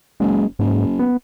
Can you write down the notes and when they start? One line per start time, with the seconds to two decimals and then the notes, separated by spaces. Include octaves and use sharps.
0.20 F#1 G#3
0.59 F#1 G#2
0.99 B3